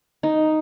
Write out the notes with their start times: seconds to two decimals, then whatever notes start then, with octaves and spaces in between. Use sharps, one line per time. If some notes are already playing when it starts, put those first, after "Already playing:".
0.23 D#4